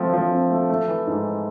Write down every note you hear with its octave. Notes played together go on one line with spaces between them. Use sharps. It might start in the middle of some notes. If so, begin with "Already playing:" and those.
Already playing: F3 A3 C4
F3
C4
A3
A3
E3
G#2